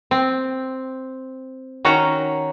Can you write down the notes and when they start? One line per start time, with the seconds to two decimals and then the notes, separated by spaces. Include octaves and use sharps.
0.11 C4
1.85 D#3 C#4 F#4 A#5